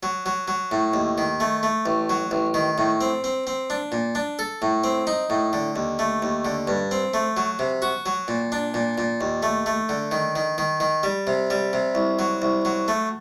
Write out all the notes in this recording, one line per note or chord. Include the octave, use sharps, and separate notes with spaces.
F#3
F#3
F#3
A2
D#2
D#3
A3
A3
A1
F#3
A1
D#3
A2
C4
C4
C4
D4
A#2
D4
A4
A2
C4
D#4
A2
D3
D#2
A3
D#2
D3
G2
C4
A3
F#3
C3
F#4
F#3
A#2
D4
A#2
A#2
D#2
A3
A3
D3
D#3
D#3
D#3
D#3
G3
C3
G3
C3
C2
F#3
C2
F#3
A3